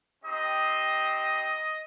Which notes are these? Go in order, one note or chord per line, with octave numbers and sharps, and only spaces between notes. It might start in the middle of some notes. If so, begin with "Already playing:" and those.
C4 D#4 G4 D#5